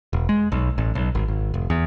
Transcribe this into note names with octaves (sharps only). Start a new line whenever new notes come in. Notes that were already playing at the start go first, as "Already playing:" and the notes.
E1
G#3
B1
A1
B1
G#1
G#1
F1
E2